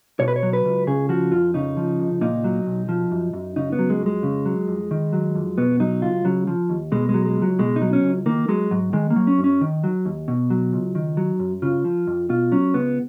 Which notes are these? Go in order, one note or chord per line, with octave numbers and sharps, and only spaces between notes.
B2 C#5
B4
C#5
F#3
B4
C#2
C#3 G#4
F3 F#4
F2 F4
C#3 D#4
F3
C#2
A#2 D#4
F#3
B1
F3
F#2
F#2
C#3 D#4
B3
F#3
G#3
F2
G#3
C#3
F#3
F2
D#3
F#3
F2
B2 B3
F#3 D#4
C#2 F4
C#3 F#3
F3
D#2
B2 G#3
G#3
F#3
G#3
C#2
F#3
B2 G#3
D#4
F#3
C#4
C#2
D#3 A#3
F#3 G#3
G#2 F#3
D#3 G#3
A#3
F#3
C#4
F#2
C#4
D#3
F#3
D#2
B2
F#3
C#2
D#3
F#3
F#2
C#3 F4
F3
F2
B2 F4
F#3 C#4
C#2 B3